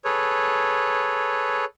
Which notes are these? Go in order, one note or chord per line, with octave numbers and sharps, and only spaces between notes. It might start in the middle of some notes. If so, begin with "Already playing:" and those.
G#4 A4 B4 C#5